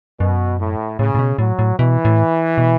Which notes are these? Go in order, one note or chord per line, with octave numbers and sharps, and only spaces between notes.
F#2 B2
A2
A2 C#3
A2
B2
A2 F#3
A2
B2 E3
A2
B2